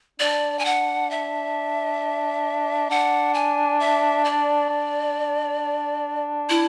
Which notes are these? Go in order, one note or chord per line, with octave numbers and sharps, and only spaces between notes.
D4 D5
G#5
F#5
E5
D4 F#5
G#5
E5
D5
D4
E4